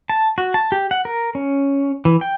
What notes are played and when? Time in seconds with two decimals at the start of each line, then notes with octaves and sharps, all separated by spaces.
0.10 A5
0.38 F#4
0.54 A5
0.72 G4
0.91 F#5
1.05 A#4
1.35 C#4
2.05 E3
2.21 G5